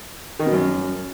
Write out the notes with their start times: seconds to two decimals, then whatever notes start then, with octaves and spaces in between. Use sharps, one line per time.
0.39 D#3
0.46 B2
0.53 F#2